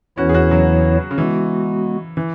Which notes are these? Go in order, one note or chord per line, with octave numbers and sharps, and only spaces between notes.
E2 E3 B3 C#4 E4 F#4 C#5
G#4
C#4 F#4
C#3 F#3
C#3
E3 G#3 B3 F#4
E3